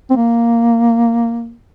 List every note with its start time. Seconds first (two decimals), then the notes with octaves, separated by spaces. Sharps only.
0.10 C4
0.16 A#3